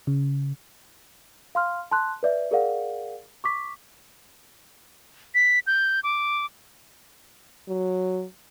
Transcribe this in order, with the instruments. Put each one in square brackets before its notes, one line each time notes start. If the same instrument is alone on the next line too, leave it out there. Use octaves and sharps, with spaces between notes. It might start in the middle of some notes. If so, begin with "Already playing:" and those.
[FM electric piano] C#3
[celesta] F5 C6 F6
A5 C6 F#6
B4 D5 E5
G#4 A#4 D5 F5 F#5
C#6 D6 B6
[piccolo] B6
G6
D6
[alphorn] F#3